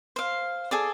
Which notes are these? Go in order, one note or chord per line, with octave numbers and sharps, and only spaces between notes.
C5 F5
G#4 A4 D5